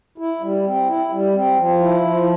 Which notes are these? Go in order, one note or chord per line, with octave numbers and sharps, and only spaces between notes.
E4
G3
C4
E4
G3
C4
F3
E4
F3